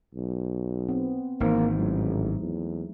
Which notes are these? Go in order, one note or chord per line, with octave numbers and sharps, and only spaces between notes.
B1
B3 C4
G#1 E3 A#3 D#4 C5
A1 F#3 G#3 A3
E2